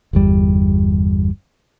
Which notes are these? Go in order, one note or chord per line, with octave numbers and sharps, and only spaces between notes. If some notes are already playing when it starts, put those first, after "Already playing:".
G1 E2 G3